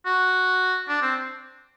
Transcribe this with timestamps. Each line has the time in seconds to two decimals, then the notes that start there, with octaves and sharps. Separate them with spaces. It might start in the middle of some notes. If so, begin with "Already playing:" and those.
0.06 F#4
0.88 D4
1.02 C4